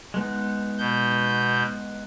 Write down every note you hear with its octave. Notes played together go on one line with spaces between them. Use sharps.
G#3 B3 D#4
B2 G6